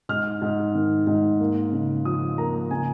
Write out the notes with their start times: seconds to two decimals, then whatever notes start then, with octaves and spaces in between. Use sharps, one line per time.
0.09 G#2 F6
0.42 G#2
0.75 D#3
1.07 G#2
1.40 A#3
1.72 C#3
2.05 F3 D#6
2.38 A#3 A#5
2.70 C#3 G#5